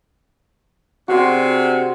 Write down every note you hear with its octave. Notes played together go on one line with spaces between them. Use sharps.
C3 D4 F#4 G#4 C6